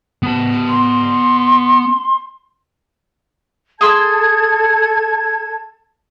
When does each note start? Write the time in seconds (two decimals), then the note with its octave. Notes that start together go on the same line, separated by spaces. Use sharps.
0.23 B3 A5
0.68 C6
3.81 G#4 A4 A5 C6 E6 G#6